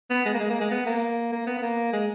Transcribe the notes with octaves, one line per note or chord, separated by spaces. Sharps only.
B3
G#3
A#3
G#3
A#3
G#3
B3
A#3
A#3
B3
B3
A#3
G#3